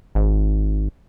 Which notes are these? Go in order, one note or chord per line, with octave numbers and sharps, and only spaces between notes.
G#1